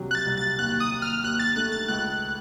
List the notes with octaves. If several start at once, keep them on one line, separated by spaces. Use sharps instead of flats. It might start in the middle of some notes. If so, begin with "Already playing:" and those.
Already playing: C2 C3 F#3
F#6
A6
C2
A6
D#2 F#6
D#6
D#2
F6
D#2 F#6
A6
A3 F#6
A6
C#2 F#6